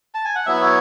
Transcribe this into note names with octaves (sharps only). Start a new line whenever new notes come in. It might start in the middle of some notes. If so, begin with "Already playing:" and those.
A5
G#5
F#5
F#3 B3 E4 E5
C#5